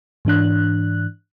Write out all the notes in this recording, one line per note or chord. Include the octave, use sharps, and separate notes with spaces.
G#2 E3 D4 F#6